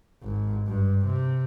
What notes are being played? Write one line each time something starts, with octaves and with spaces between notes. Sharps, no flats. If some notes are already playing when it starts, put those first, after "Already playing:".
G#1
G2
C3